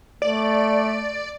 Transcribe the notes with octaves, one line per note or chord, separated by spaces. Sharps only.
A3 D5